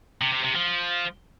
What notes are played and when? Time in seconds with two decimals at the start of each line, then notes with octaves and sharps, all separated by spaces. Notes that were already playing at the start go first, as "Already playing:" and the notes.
0.21 C3
0.33 C3
0.44 C3
0.55 F3